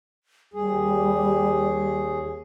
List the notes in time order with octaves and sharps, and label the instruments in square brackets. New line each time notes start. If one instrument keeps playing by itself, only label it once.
[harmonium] D#2 G#4 [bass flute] G3